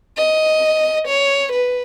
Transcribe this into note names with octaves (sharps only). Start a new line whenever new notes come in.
D#5
C#5
B4